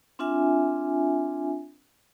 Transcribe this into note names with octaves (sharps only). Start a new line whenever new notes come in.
C4 D4 F4 E5 G#5